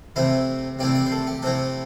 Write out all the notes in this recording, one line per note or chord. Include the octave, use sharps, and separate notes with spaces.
C3 A3 C4 E4 E5
C3 A3 C4 E4 D5
D5
C5
A4
G4
C3 A3 C4 E4 A4